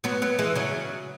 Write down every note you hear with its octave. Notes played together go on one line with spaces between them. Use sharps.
F#3 B3
F#3 B3
E3 G#3
C#3 F#3